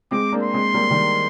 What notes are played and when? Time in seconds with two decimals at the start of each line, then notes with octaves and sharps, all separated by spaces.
0.11 G#3 C4 D6
0.33 A#3 D4
0.43 C6
0.54 G#3 C4
0.74 G3 A#3
0.90 D#3 G3